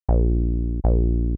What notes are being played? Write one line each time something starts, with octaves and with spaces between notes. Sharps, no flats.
A#1
A#1